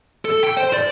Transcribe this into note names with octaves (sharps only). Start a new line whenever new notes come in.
A4
G5
C5
D5